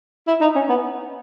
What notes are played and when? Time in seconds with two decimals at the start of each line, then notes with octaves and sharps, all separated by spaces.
0.27 E4
0.41 D#4
0.56 C#4
0.69 B3